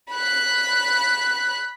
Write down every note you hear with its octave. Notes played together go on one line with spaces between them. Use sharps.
B5 F#6